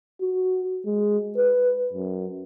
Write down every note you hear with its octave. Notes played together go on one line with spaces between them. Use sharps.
F#4
G#3
B4
F#2